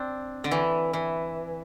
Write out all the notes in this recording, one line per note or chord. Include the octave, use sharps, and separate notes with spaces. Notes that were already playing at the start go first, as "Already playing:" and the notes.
Already playing: C4 D4
D3
E3
E3